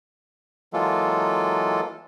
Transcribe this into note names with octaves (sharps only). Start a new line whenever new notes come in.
E3 F#3 G#3 A#3 F4 A4